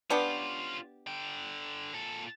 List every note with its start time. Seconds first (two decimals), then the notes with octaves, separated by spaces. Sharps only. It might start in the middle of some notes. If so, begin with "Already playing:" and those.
0.10 B3 C#4 D4 F4 G4
1.07 D3 G5
1.94 A#2 A4